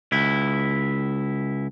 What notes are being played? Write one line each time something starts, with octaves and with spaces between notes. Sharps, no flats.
C#2 E4